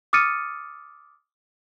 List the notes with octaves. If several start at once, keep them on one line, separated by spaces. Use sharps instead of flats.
D6 D#6 F6 A6 C#7 D#7